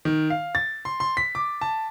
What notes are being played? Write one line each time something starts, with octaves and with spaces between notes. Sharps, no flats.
D#3
F5
A6
C6
C6
B6
D6
A5